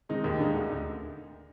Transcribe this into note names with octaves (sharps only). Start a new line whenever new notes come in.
D#3 G#3 C4 D#4
D#2
D3 G#3 D#4
D2